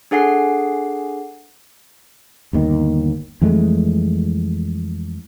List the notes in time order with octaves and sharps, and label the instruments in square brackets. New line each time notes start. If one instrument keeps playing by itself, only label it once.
[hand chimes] D4 G#4 A4 F#5 G#5 C7
[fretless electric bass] G1 D#2 D#3
F2 E3 G#3 A3